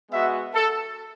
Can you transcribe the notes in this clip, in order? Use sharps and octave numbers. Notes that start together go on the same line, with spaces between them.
G#3 B3 F#4 E5
A4